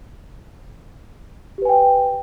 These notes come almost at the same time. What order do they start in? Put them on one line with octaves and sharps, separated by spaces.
G4 B4 G#5 G5